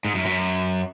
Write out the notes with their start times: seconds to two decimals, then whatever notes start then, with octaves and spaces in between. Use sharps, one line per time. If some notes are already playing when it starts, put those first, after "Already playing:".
0.05 G#2
0.15 F#2
0.26 F#2